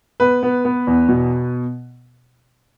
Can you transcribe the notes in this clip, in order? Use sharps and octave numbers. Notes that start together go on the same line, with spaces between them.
B3 B4
B3
B3
E2
B2